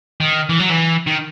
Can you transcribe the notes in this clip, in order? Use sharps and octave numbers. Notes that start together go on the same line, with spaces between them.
D#3
E3
F#3
E3
D#3